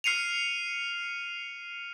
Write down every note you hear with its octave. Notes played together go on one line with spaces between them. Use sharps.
F6 C7 C#7 D#7 F7